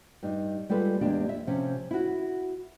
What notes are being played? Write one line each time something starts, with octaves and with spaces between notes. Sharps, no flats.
G2 D#4
G3 G#3 F4 A4 B4
E2 G#3 A#3 D4 G4
E5
C3 F3 C#4
E4 F#4